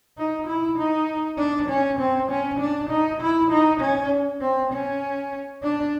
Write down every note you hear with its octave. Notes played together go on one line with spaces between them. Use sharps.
D#4
E4
D#4
D4
C#4
C4
C#4
D4
D#4
E4
D#4
C#4
C4
C#4
D4